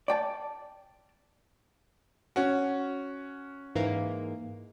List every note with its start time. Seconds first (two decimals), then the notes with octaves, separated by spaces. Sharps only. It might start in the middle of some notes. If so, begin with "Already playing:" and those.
0.08 D5 G5 A5
2.36 C#4 F#4
3.75 G#2 E3 A#3